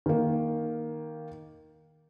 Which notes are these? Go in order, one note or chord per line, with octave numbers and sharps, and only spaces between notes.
D#3 A#3